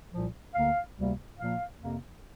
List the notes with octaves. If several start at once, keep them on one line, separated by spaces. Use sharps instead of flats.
C2 A#2 F3
D2 D3 A#3 F5
D2 C3 G3 A#3
A#2 F3 A#3 F5
F2 C3 A#3